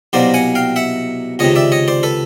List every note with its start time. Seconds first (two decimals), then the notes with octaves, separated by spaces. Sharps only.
0.13 C2 B2 F#3 A#3 C5 D5
0.34 F#5 G#5
0.55 F5 G5
0.76 E5 F#5
1.39 C#2 C3 D#3 C#5 D#5
1.56 D5 E5
1.72 C#5 D#5
1.88 C5 D5
2.03 A4 B4